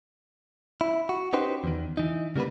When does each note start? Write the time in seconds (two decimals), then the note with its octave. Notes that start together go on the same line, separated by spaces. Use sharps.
0.81 E4
1.09 F#4
1.33 C#4 D#4 F#4 G4 B4 C5
1.64 E2 D#3
1.97 E3 D#4
2.36 C#3 G3 A#3 B3 B4